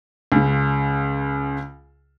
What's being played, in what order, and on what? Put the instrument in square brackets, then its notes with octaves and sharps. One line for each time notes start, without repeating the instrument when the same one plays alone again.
[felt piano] C#2 C#3